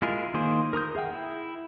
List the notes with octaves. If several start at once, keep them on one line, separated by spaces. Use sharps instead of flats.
G#3 E4 F4 G#4 A#4
D#3 A#3 G#4 C5
A#4 A#5 D#6 G6
G#4 E5 F#5 G5
E4